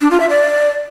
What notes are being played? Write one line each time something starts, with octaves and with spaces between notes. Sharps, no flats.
D4
F4
E5
D5